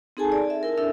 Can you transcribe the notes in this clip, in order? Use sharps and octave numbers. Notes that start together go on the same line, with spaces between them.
C4 D#4 G#4 A4 G#5 A5
D5
E5
E4 A#4
D4 E4 A4 E5